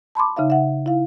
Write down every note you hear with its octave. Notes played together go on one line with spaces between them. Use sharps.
A5 B5 C6 D6
C#3 D#4 E5 F5
E5 F#5
E4 F5